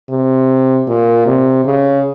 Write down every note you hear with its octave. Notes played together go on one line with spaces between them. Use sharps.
C3
A#2
C3
C#3